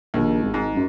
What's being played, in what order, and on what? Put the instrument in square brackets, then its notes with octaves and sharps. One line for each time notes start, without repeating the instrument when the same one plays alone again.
[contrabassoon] A#1 [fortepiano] D#2
[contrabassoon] G#1
[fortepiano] G#2
[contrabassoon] F#2